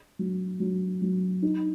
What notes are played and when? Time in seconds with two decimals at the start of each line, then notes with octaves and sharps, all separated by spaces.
0.19 F#3
0.60 F#3
1.02 F#3
1.42 D#4